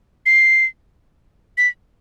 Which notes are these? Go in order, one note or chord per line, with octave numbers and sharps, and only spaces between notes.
C7
B6